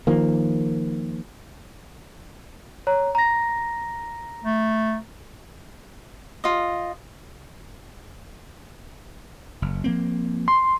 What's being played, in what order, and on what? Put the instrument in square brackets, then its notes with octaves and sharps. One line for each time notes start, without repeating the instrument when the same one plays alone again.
[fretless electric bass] D#3 F3 A#3
[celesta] C#5 A#5
A#5 A#6
[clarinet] A3
[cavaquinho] F4 D#5
[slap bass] F#1
F3 A#3 C4
[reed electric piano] C6